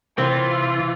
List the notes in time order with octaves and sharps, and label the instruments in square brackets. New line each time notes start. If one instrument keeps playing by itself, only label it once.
[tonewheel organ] C3 [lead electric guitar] E3 [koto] C4 [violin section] F4